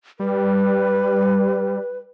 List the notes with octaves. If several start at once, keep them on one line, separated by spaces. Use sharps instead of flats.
G3 B4